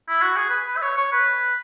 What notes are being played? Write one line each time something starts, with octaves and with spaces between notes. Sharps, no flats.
E4
F#4
G#4
B4
B4
E5
C#5
C#5
B4